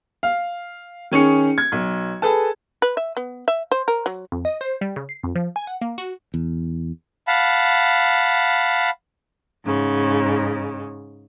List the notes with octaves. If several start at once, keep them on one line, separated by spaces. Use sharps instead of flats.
F5
D#3 C#4 G#4 C#7
G#6
B1
G#4 A4 B4 A5
B4
E5
B3
E5
C5
A#4
F#3
F2
D#5
C5
G3
C#3
C7
F2
F3
G#5
F#5
A#3
F#4
E2
F5 F#5 A5 B5
G#2 C#3